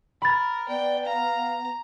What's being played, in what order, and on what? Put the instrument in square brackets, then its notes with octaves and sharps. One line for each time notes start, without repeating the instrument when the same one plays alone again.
[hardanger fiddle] A#4 [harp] B5 A6
[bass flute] B3 [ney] D5 [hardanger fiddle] G5
[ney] F5 [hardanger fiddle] A#5